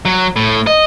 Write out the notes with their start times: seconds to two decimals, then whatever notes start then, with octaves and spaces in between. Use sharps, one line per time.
0.05 F#3
0.36 A2
0.67 D#5